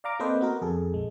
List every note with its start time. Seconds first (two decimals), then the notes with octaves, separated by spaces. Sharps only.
0.04 D5 F5 A#5 D6
0.19 A#3 C4 A4 B4 C5 D#5
0.41 B3 F#4 A#4
0.61 F2 G#4 A4
0.93 A#1 G#3